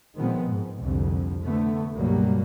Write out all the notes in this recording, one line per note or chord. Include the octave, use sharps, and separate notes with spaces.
A#2 D#3 F3 G#3 B3 C4
G#2
C2 F2 D3
D3 A3 B3
C#2 G2 B2 F#3 G3 A#3